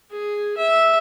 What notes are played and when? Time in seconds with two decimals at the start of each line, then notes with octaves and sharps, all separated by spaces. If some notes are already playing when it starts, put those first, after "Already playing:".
0.12 G#4
0.57 E5